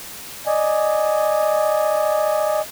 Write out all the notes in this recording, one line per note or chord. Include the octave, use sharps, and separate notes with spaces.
D5 D#5 G#5